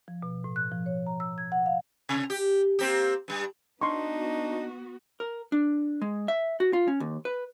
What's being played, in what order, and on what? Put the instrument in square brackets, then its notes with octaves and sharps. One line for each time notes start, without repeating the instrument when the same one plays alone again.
[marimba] F3
B2
A2
F#6
F3
C#5
A#5
E6
G#6
F#5
F5
[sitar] C3
G4
A#3 C4 G4
G2 G3
[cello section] B3 F#4 [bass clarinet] D4 [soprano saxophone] D#4 [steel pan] C6 C#6
[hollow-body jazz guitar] A#4
D4
G#3
E5
F#4
F4
C#4
D#2
B4